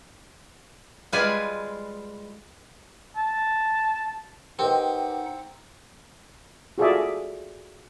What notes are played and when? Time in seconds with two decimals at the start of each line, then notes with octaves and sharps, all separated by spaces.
1.12 G3 G#3 F4 B4 F5 G#5
3.16 A5
4.59 C4 D#4 G4 A#4 B4 D#5 F#5 G5
6.78 F4 F#4 G#4 A4 D5 E5